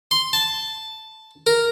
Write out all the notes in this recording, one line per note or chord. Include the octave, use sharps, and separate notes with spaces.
C6
A5
A#4